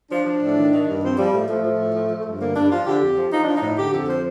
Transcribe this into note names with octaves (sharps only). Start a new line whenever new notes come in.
F3 D4
F3
A2
D#3
D#3
G2
F3 C4
F3 G3
A2 A3
F3 A3
F3
A2
F3
F3
G2
D3 A#3
G2 D4
F3 F4
D3 G4
F2
F3
F3 D#4
F3 D4
D#4
A2
D3 G4
F2 A4
F3 C5